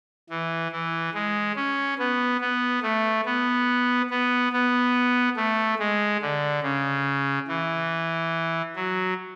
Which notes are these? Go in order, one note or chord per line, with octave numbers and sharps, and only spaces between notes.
E3
E3
G#3
C#4
B3
B3
A3
B3
B3
B3
A3
G#3
D3
C#3
E3
F#3